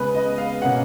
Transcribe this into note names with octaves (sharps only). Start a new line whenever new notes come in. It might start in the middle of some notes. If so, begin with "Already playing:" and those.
Already playing: C#3 G#3 B3 B4
D#5
F5
B2 A#3 C#4 F#5